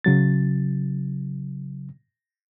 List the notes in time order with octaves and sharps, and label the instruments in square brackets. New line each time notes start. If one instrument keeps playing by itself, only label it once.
[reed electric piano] C#3 F#3 A6